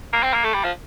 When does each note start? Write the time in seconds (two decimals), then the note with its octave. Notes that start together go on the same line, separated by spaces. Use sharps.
0.13 A#3
0.23 C4
0.34 A#3
0.44 A3
0.54 G3
0.64 F3